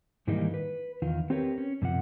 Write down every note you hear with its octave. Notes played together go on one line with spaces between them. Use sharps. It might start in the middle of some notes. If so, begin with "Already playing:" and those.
G#2 D#3 E3 G3 A#3 D#4
B4
E2 D#3 F4
C4 G4 A#4 B4 C#5
C#4
F#2 C3 F3 F#5